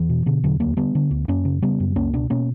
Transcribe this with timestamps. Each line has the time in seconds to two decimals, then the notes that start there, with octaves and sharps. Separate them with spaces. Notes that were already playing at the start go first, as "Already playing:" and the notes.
Already playing: E2 E3
0.09 B2
0.26 B2 D3
0.43 E2 D3 F#3
0.60 D2 F#3 A#3
0.77 D3 G3 B3
0.95 D3
1.11 D2
1.28 F#2 A#3 C#4
1.45 C#3
1.62 C#3 G3 B3
1.80 F#2
1.96 C#2 A#3 C#4
2.13 B2 B3 D4
2.30 B2 A#3 C#4